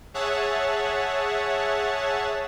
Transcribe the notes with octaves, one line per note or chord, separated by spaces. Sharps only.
G#4 C#5 E5 F#5 A5